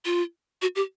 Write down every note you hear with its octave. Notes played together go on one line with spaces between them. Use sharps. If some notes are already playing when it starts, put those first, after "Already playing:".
F4
F#4
G4